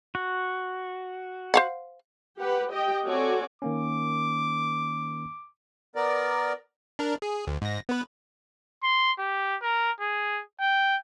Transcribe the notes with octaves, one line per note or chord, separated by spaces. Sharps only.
F#4
C5 F5 F#5
G4 B4 F#5
G4 D#5 G5
C4 F#4 A4 C#5 D5 G#5
D#3 A#3 C#4 D6
B3 A#4 D5
D4 A#4
G#4
D2
G#2 A#6
B3 B4
C6
G4
A#4
G#4
G5